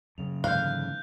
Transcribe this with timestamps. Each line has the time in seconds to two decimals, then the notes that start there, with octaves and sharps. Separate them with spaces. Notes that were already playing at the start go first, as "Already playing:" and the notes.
0.18 F#2 C#3 F7
0.44 G#2 D3 E3 F5 F#6 G6